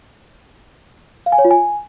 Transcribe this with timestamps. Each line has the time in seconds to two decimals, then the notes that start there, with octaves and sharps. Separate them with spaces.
1.26 F5
1.32 G#5
1.38 C#5
1.45 F4
1.51 G#5